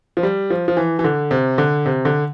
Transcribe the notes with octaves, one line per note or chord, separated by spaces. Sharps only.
F3
G3
F3
F3
E3
E3
D3
C3
D3
C3
D3